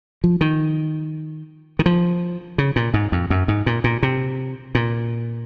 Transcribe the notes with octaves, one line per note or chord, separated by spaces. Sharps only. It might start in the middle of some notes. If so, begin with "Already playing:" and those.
F3
D#3
D#3
F3
C#3
A#2
G#2
F2
F#2
G#2
A#2
A#2
C3
A#2